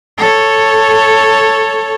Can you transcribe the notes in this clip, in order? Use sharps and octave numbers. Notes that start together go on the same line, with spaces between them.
A4 C#5